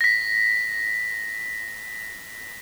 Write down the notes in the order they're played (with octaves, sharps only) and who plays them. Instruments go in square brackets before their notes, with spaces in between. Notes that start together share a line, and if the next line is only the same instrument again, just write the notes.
[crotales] A#6 B6